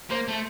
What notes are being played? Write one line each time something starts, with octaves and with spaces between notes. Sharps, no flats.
A#3 C5
A3